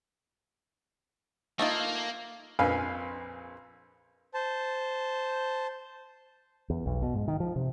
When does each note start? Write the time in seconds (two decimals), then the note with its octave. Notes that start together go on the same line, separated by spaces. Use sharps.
1.59 A3 A#3 D#4 F4
2.59 A#1 F2 B4 F5 G#5
4.34 C5 A5
6.70 E2
6.86 B1
7.02 B2
7.15 G#2
7.28 D#3
7.40 F3
7.56 C3